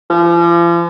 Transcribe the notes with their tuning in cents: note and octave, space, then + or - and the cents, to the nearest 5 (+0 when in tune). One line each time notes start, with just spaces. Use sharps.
F3 -40